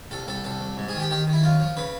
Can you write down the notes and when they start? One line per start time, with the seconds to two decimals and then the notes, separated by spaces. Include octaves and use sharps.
0.11 C2 A4
0.27 C2 A4
0.44 C2 A4
0.61 C2
0.77 G#2
0.89 G#4
0.94 D#3
1.00 G4
1.10 D#3 G4
1.28 D#3
1.33 E4
1.43 F#2 F4
1.60 F3
1.77 C#3 B4